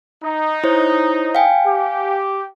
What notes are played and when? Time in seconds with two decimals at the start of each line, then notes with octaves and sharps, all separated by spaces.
0.24 D#4
0.64 E4 C5 C#5
1.35 F5 G5 G#5
1.66 G4